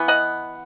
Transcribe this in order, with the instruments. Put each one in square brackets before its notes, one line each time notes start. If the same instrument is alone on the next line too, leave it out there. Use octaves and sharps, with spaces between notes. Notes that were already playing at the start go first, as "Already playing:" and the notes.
Already playing: [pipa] E3 B3
D#5 F#5